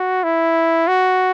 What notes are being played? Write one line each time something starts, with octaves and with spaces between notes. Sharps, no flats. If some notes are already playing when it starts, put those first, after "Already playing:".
Already playing: F#4
E4
F#4